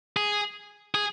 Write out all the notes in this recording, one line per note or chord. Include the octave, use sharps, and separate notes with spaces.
G#4
G#4